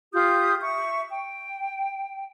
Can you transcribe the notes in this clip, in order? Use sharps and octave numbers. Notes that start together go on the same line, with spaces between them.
F4 G4 D#6 G6
E5 C#6
G5